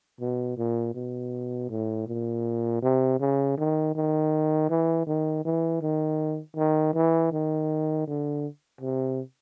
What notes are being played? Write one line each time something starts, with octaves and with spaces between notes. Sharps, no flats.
B2
A#2
B2
A2
A#2
C3
C#3
D#3
D#3
E3
D#3
E3
D#3
D#3
E3
D#3
D3
C3